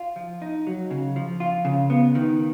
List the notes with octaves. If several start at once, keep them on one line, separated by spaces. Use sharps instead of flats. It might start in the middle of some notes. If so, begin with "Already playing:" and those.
Already playing: F4
F3
D#4
F#3
C#3
F3
F4
C#3
B3
D#3